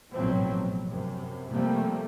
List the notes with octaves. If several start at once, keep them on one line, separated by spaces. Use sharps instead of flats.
A1 G#2 B2 F3 F#3 C4
B2
F#2 C3
C3 F3 G3 A3 A#3